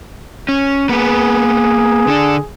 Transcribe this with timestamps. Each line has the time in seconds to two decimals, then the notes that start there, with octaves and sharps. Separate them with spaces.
0.49 C#4
0.89 A#3 B3 G#4 B4
2.07 D3 D4